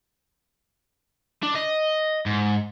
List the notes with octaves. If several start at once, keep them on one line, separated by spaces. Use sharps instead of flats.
D4
D#5
G#2